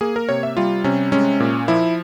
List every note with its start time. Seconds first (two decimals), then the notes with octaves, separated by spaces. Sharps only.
0.01 A#3 G#4
0.16 A#4
0.29 C3 C#5
0.43 E5
0.57 G3 F4
0.84 C3 C#4
1.12 G#3 C#4
1.40 A#2
1.68 F3 E4